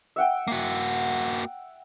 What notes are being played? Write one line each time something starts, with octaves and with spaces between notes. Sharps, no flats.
E5 F#5 G5
A#3 F#4